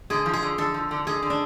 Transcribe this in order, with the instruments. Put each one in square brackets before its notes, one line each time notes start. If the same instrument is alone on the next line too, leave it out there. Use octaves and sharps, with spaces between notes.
[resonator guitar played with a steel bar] D3 [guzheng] G#4
[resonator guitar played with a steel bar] F3
[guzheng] G#4
[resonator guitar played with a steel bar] D3
[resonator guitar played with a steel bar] D3 [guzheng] A4
[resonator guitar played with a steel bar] F3
D3
[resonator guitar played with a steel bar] D3 [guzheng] G#4
[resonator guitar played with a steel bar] D3
[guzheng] D4